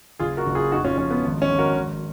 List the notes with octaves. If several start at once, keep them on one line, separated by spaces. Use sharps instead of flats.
F#1 F4 G#4
F#4 A#4
F#1
F4 G#4
F2 D#4 F#4
C#4 F4
F3 C#4
B3
G#1
C#4
G#1
F#4 A#4
G#1